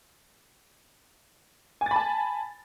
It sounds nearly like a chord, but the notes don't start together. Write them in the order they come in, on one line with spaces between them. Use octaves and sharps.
G#5 A6 B5 A5